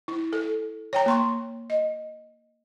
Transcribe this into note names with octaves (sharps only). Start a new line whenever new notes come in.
E4
A4
C#5 G5 A#5
A#3 C6 C#6
D#5